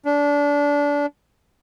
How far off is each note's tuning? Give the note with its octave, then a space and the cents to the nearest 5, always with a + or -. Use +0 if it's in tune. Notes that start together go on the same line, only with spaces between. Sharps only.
D4 -25